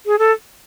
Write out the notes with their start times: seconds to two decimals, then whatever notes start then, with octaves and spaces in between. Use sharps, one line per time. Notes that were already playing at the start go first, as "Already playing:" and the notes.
0.06 G#4
0.19 A4